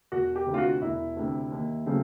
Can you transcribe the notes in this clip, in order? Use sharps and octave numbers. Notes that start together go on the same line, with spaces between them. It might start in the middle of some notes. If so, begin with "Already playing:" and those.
E1 F#4
G4
D2 C3
F4
F#4
E1 E4
D2 C3
D#2
C#3 F#3 A3 C4